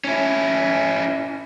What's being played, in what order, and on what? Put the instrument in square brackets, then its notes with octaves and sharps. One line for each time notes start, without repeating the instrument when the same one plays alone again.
[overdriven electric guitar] C#4 E4